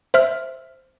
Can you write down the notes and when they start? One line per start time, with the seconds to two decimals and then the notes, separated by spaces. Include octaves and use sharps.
0.14 C5 E5 F6